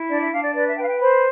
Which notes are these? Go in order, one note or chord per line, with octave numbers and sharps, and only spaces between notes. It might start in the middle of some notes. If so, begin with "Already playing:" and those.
Already playing: E4
D4 D5
E5
D4 F5
D5
B4 D5
E5
B4 G5
F5
G5
C5 B5